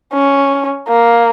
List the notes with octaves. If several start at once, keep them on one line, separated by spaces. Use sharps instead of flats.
C#4
A#3